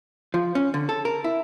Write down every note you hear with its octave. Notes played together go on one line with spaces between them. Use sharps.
F3
C#4
D3
A4
A#4
E4